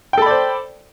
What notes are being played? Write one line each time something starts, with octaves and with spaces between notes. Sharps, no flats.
A4 C5 D5 G5 B5